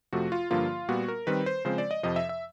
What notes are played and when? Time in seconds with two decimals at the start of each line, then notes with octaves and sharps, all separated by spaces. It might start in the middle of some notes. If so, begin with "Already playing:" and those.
0.13 F2 C3 F3 A3 F#4
0.32 F4
0.50 G2 D3 F3 A#3 F4
0.89 A#2 G3 B3 F#4
1.08 A#4
1.27 D#3 G3 C4 B4
1.46 C5
1.65 C#3 F3 G#3 C4 C5
1.78 D5
1.91 D#5
2.03 F2 C3 F3 D#5
2.16 E5
2.29 E5